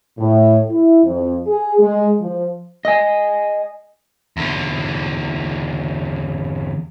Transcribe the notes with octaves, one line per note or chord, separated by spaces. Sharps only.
A2
E4
F2
G#4
G#3
F3
D#5 G#5
E2 D3